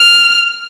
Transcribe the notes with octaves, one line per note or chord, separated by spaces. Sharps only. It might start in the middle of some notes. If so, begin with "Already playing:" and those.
Already playing: F6